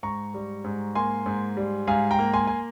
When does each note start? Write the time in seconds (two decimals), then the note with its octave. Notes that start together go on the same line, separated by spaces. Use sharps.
0.03 G#2 A#5 C#6
0.34 G3
0.64 G#2
0.95 A#3 G#5 C6
1.26 G#2
1.57 G3
1.87 G#2 F5 G#5
2.11 G5 A#5
2.19 A#3
2.33 G#5 C6
2.47 G#5